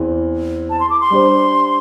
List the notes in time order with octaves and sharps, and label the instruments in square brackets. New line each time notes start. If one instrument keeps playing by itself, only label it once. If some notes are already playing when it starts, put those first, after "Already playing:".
Already playing: [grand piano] E2 E3 C4
[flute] A5
C6
D6
C6
[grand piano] G3 D4 G4 C5